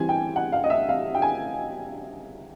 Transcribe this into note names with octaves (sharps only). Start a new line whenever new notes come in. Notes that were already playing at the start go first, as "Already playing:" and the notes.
Already playing: E3 G3 C4 G#5
G5
F#5
F5
D#5
E5
F5
G5
G#5